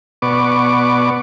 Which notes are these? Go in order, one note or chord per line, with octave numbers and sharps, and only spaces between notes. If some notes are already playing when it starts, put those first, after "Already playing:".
B2 B3 D5 C#6 D6